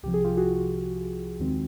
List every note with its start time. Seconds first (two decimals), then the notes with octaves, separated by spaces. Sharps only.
0.03 C2 C3 F3 G4
0.14 G#4
0.24 F4 G4
0.37 F#4 G#4
1.39 D#2 D#3 G#3 C4